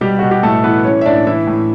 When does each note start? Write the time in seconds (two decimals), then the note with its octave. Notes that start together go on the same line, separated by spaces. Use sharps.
0.01 B2 G3 G4
0.19 B2 F#4
0.31 G4
0.43 A2 A3 A4
0.64 E3 B3 B4
0.84 E3 C#4 C#5
1.01 E5
1.06 A2 D4 D5
1.27 E3 E4 E5
1.47 A2